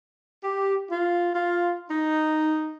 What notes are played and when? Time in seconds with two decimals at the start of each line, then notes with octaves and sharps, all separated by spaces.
0.44 G4
0.91 F4
1.34 F4
1.90 D#4